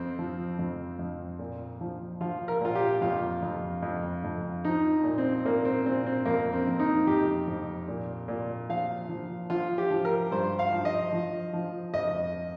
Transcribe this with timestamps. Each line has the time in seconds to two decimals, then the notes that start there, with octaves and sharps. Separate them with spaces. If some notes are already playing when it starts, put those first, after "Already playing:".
Already playing: F2 C4
0.19 F3
0.59 F2
0.99 F2
1.39 A#2
1.81 F3
2.21 F3 F4
2.48 A#4
2.61 A#2 F4
2.75 G4
3.01 F2 F4
3.42 F2
3.82 F2
4.24 F2
4.65 F3 D#4
5.04 A#2
5.18 C4
5.46 A#2 A#3
5.65 C4
5.85 A#2 C4
6.06 C4
6.26 F2 A#3
6.53 C4
6.67 F2
6.80 D#4
7.07 F2 G4
7.48 F2
7.88 A#2
8.28 A#2
8.69 F3 F5
9.09 F3
9.50 F3 F4
9.78 G4
9.90 F3
10.05 A#4
10.31 G2 C5
10.59 F5
10.72 F3
10.85 D#5
11.12 F3
11.53 F3
11.94 F2 D#5